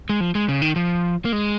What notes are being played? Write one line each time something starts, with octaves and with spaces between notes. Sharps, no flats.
G#3
F3
G#3
C#3
D#3
F3
A#3
G#3